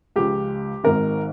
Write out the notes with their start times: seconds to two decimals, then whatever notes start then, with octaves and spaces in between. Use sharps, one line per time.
0.16 C#2 C#3 F3 G4
0.84 G#1 G#2 D#3 A#4